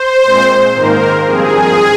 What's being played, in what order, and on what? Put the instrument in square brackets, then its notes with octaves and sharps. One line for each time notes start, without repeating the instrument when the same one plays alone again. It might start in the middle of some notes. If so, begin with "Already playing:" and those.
Already playing: [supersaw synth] C5
A#2 G#3 C4
G#2 D#3 A#3 A#4
G2 F3 C4 G#4